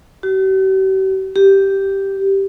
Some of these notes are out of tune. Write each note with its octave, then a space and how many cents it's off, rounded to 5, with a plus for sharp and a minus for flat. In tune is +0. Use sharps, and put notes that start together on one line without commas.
G4 -45
G4 -5